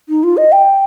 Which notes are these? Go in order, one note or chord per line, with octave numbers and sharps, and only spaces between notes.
D#4
F4
D#5
G5